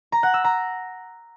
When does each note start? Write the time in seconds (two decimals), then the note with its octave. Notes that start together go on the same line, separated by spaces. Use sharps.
0.12 A#5
0.23 F#5
0.34 E6
0.44 A#5